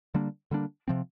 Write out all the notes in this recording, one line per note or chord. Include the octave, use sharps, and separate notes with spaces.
D3 G3 A#3 D4
D3 G3 A#3 D4
C3 F3 C4